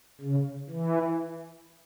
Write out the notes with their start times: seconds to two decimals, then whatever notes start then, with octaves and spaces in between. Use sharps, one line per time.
0.21 C#3
0.70 E3